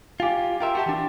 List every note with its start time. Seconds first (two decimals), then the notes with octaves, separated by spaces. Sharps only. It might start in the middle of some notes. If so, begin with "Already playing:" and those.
0.20 F4 G4 F5 G#5 D6
0.60 F4 A#4 E5 G5 C6
0.75 F#4 G4 A5
0.86 E3 D4